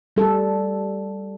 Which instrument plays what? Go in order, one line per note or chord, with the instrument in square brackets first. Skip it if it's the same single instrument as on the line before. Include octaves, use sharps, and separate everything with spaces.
[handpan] G3 A4